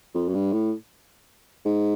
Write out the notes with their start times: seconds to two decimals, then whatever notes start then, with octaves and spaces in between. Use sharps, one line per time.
0.15 F2
0.28 F#2
0.34 G2
0.53 A2
1.65 G#2